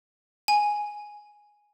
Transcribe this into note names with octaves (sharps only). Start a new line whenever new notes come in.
G#5